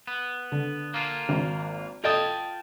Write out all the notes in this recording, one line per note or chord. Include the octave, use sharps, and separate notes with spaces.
B3
D3
A#3 D4 F4
G#1
F4 A4 D#5 G5 A5 D#6